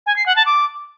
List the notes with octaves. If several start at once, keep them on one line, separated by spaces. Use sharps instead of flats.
G#5
C7
F#5
A5
D6